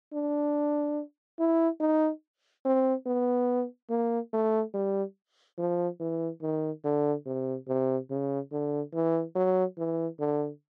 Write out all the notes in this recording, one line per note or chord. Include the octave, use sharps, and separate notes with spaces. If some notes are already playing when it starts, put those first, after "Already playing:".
D4
E4
D#4
C4
B3
A#3
A3
G3
F3
E3
D#3
D3
C3
C3
C#3
D3
E3
F#3
E3
D3